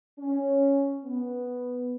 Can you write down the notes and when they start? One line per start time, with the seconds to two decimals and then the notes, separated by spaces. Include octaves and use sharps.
0.18 C#4
1.04 B3